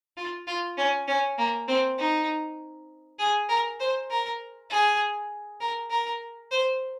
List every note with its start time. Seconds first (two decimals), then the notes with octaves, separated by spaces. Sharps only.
0.17 F4
0.47 F4
0.77 C#4
1.08 C#4
1.38 A#3
1.68 C4
1.99 D#4
3.19 G#4
3.49 A#4
3.80 C5
4.10 A#4
4.70 G#4
5.61 A#4
5.90 A#4
6.51 C5